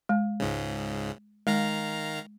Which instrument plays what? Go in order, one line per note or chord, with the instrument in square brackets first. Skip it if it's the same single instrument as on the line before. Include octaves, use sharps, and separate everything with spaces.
[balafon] G#3
[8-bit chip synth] C#2 G#2 C#3
[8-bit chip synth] D#3 F5 A#5 [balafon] G#3